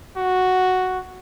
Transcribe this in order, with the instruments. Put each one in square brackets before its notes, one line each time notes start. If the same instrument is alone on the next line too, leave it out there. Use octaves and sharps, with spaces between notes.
[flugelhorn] F#4